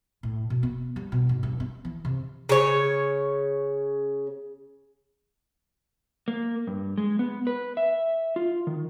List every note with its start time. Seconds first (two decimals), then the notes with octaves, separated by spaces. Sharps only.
0.23 A2
0.50 B2
0.63 B3
0.96 G3
1.12 B2
1.29 G#2
1.43 G2
1.60 B3
1.85 E3
2.05 C3
2.49 C#3 C#5
6.28 A#3
6.67 G2
6.98 G#3
7.19 B3
7.47 B4
7.77 E5
8.36 F4
8.67 D#3